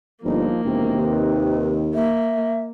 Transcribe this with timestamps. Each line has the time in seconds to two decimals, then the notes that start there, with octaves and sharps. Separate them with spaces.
0.24 G1 F3 A#3 D#4
0.65 E1 C3 D#3 C4
0.97 D#2 B4
1.94 A#3 E5